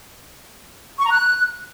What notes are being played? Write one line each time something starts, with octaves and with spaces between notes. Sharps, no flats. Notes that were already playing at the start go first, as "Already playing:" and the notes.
C#6
A#5
F#6